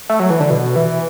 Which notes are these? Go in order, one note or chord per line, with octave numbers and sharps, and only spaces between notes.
A3
F#3
E3
D3
B2
E3